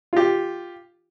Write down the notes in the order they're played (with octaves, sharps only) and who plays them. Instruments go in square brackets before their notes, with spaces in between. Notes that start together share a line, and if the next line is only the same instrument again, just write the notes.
[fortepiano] F4 G4